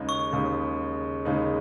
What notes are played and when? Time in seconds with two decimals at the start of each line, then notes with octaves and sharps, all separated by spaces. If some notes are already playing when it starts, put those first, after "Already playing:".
Already playing: D#2 C#3 G#3 D#4
0.09 C#6
0.32 D#2 C#3 G#3 D#4
1.25 D#2 C#3 G#3 D#4